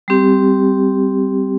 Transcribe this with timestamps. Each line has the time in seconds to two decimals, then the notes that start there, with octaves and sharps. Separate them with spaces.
0.08 G3 C4 G4